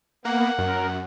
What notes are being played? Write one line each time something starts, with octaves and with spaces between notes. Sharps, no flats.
A#3 B3 F#5
F#2 A#4